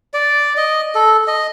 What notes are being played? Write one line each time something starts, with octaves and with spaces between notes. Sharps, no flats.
D5
D#5
A4
D#5